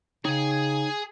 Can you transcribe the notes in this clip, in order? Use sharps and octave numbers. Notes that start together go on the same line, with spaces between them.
C#3 D#4 G#4 C#5 G5 G#5